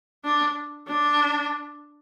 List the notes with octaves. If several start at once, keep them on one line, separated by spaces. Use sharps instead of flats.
D4
D4